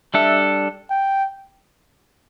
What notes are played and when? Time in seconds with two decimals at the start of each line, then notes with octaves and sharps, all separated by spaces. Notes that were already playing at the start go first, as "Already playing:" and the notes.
0.14 G3 D4 A4 E5
0.90 G5